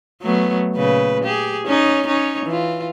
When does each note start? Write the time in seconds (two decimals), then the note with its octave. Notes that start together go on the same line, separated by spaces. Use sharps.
0.23 F#3 A3 B3
0.75 A#2 C#3 B4
1.25 G4 G#4
1.66 C#4 D#4 C#5
2.08 C#4 D#4 C#5
2.46 E3 F4